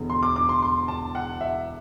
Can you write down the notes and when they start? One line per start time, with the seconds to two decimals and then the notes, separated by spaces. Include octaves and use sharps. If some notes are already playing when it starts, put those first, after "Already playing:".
Already playing: E1 E2 D3
0.10 C6
0.23 D6
0.36 D6
0.49 C6
0.62 C6
0.88 A5
1.15 F#5
1.41 E5